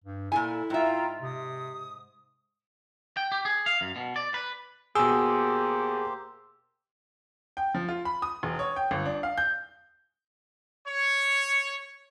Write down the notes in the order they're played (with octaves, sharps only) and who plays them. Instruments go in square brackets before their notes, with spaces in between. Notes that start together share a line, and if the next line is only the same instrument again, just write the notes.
[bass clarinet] G2
[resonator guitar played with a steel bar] A#2 A4 G#5 [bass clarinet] E4
[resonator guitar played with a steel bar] G#2 E5 [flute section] F4 G5 A#5
[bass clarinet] C3 [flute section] D#6
[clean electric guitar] G5
G4
G#4
F5
F#2
B2
D5
B4
[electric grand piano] B2 E6 [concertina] A#3 G4 C5 [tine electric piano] G#4
[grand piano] G5
F3
F4
B5
D#6
E1
C#5
G5
G1
D4
F5
G6
[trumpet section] C#5